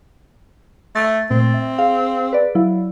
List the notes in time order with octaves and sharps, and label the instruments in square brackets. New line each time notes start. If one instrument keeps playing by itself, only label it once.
[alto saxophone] A3 [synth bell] A6
[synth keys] A#2 A3 [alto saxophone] C4
[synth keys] E5
[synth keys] G#4 [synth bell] F5
[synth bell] B4 D5
[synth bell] F#3 E4 [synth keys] F5